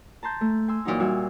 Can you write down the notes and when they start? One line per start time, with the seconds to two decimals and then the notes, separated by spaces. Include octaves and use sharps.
0.23 A5 A#5 C6 G6
0.41 A3
0.68 G#5 C6 E6
0.85 F2 A#2 E3 F#3 D#4
1.00 A#2 G3 F#4 E5 F5 G#5